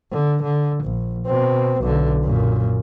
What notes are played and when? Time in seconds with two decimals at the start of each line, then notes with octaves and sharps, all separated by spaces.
0.12 D3
0.43 D3
0.84 A#1
1.27 B2 C4
1.82 B1 D3
2.24 F#2 A#2